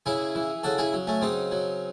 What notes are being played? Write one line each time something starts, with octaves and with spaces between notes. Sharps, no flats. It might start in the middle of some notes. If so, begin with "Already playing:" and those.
C#3 E4 G#4
E3
C#3 F#4 A4
E4 G#4
F#3
A3 C#4
C#3 C4 D#4
F#3